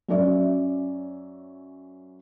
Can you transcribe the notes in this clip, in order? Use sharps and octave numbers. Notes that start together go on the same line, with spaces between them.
F#2 C#4 D5 E5